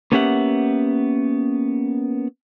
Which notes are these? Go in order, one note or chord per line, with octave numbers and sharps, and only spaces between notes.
A#3 B3 C#4 G4 E5 F#5